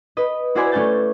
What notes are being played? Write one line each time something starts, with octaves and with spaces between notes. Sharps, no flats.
B4 D#5
E4 F#4 B4 C5 D5 G#5
A3 C#4 D5 G#5 G6 A6